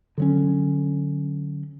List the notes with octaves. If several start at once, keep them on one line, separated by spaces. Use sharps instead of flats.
D3 F#3 C#4